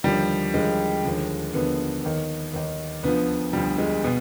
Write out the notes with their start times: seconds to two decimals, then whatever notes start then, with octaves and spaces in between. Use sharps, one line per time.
0.04 D#2 D3 F3 G3
0.54 D#2 D3 F3 G#3
1.04 D#2 D3 F3
1.53 D#2 D3 F3 B3
2.04 D#2 D#3
2.53 D#2 D#3
3.03 D2 D3 F3 B3
3.53 D2 D3 F3 G3
3.78 G#3
4.04 B2 B3